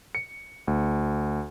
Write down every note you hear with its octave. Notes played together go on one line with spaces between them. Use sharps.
C#7
D2